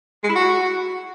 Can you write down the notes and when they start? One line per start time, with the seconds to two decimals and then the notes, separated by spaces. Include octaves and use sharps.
0.24 G#3
0.30 E4
0.36 F#4